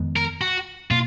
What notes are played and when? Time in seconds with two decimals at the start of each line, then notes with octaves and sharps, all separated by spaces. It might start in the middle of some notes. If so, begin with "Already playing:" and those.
Already playing: F2 D#3 G#3 B3
0.16 A#4
0.41 F#4
0.91 B2 A#3 F4